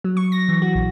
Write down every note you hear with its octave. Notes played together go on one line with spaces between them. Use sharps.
F#3
C#6
A#6
E3
F#4
A#1